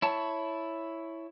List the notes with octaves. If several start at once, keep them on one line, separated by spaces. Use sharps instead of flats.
E4 C#5 A5